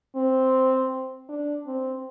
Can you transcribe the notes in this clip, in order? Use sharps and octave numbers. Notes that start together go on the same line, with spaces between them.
C4
D4
C4